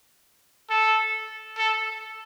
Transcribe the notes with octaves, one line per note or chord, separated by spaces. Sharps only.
A4
A4